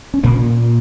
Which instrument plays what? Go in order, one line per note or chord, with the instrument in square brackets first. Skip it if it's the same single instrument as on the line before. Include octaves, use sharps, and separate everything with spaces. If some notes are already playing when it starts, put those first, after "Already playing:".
[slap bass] C#4
A#2 A#3